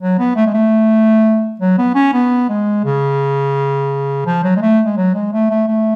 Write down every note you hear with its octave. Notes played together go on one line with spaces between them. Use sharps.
F#3
B3
A3
G#3
A3
F#3
B3
C#4
B3
G#3
C#3
F3
F#3
G#3
A3
G#3
F#3
G#3
A3
A3
A3